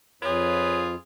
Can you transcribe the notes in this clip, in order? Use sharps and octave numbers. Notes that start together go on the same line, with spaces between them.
F2 F4 G#4 B4 C#5